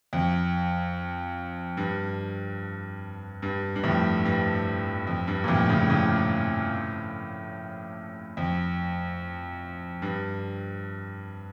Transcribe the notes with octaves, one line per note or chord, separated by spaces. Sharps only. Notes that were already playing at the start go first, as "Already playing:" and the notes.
F2
G2
G2
G2
F2 A2
G2
F2
G2
A#2
F2 A2
A2 C#3
A2 C#3
F2
G2